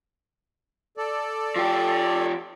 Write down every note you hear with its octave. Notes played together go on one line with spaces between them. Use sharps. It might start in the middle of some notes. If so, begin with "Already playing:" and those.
A4 D5
F3 G4